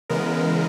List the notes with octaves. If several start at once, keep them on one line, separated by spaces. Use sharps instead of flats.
C#3 E3 G#3 B3 A#4